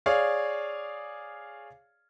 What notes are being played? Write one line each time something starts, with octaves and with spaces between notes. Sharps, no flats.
G#4 C#5 D5 F5